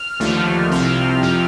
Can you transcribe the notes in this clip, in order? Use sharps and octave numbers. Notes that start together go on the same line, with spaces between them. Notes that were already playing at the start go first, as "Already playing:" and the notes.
Already playing: F6
D#2 D3 F3 A3
C2 C3 F3 C4
F2 C3 F3 C4